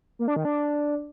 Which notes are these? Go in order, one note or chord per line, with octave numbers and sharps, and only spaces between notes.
A#3
D4
D#3
D4